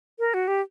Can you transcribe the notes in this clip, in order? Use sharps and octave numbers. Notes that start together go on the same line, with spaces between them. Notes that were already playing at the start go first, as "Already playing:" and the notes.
A#4
F#4
G4